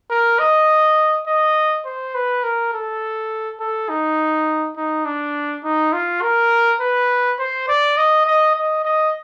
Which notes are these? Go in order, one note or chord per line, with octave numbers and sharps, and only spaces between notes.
A#4
D#5
D#5
C5
B4
A#4
A4
A4
D#4
D#4
D4
D#4
F4
A#4
B4
C5
D5
D#5
D#5
D#5
D#5